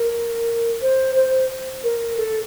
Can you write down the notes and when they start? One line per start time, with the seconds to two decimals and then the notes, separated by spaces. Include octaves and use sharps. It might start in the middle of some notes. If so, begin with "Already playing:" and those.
Already playing: A#4
0.81 C5
1.15 C5
1.83 A#4
2.17 A4